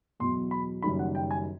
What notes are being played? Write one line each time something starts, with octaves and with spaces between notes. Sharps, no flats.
E2 B2 F#3 C6
B5
F#1 F#2 D#3 G3 B5
F#5
G5
G#5